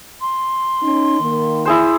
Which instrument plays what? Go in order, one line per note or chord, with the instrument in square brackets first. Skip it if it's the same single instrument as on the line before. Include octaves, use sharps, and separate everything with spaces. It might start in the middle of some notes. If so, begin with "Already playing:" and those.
[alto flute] C6
[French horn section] C#4 D#4
D#3 A#3
[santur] E4 G#4 C5